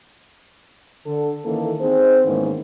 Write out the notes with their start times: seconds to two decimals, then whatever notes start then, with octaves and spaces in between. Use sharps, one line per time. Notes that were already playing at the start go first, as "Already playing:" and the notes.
1.06 D3 A4
1.45 D#3 E3 A#3 C#4 A4
1.81 C4 D#4 G#4 C5
2.25 G#2 D#3 E3 A#3 B3 C#4